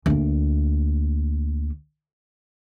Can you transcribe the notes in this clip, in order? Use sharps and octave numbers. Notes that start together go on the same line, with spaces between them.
D2 A#3